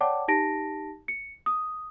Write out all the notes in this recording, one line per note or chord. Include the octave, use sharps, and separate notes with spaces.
C#5 D5 F#5 G5 A5 D6
D#4 G4 A5 A#6 D7
C#7
D#6